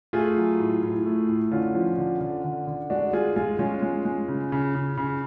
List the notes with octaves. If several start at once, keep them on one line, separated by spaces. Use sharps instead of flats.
A3 F4 G#4
F#3
A2
A2
A3
A2
D3 C#4 F4
F3
D3
D3
D3
D3
G#3 D4 F#4
G#3 F4 G#4
G#3 F4 G#4
G#3 C#4 F4
G#3
G#3
C#3
C#3
C#3
C#3